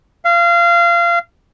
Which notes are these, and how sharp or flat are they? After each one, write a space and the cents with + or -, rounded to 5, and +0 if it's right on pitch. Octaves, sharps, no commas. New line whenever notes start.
F5 -25